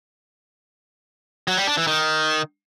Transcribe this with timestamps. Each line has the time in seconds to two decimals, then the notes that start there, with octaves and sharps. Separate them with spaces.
1.48 F#3
1.57 G3
1.67 D4
1.77 E3
1.87 D#3